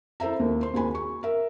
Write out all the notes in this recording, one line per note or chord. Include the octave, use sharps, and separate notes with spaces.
E4 A4 C5 E5 A#5
D#2
C5 C6
D#2 F#4 G#4 G#5 B5
C#6
A#4 E5